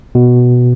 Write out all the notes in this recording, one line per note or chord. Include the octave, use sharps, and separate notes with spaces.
B2